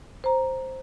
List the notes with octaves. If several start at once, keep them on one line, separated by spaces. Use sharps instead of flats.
C5 A#5